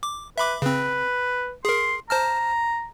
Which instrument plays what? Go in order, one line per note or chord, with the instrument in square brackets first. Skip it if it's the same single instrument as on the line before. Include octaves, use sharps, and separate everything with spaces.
[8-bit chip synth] D6
[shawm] B4 [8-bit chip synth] E5 B5 D6
[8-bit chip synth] C#3 C4 [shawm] B4
[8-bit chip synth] G#4 A#4 [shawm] C6
[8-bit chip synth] C5 A5 F6 [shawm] A#5